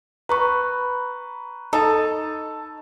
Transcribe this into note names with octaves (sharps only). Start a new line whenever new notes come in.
B4 A#5 B5 C#6
D#4 A4 A5